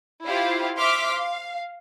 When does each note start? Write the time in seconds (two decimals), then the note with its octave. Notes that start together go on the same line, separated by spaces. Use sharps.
0.25 E4 F4 G4 C5 F5
0.78 C5 E5 C6 D6 F6 B6
1.12 F5